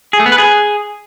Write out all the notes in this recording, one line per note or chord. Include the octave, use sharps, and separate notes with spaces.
G#4
A3
B3
B4
G#4